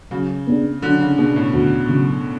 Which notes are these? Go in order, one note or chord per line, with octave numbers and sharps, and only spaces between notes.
C#3 F#3
B3 D4 G#4
D3 F#3
C#3
B2 B3 D4 G#4
A2
D2
C#3 F#3